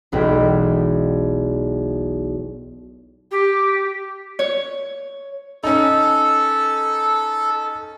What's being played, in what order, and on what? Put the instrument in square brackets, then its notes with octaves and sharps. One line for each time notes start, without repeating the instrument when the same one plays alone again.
[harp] E1 B1 F#3 G5 B6
[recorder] G4
[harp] C#5
[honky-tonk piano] C#4 D#4 [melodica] A4